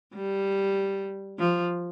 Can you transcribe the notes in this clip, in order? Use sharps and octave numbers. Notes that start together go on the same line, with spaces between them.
G3
F3